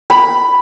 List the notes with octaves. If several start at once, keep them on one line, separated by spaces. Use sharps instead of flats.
B5